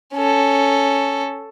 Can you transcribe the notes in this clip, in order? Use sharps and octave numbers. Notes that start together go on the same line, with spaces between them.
C#4 A4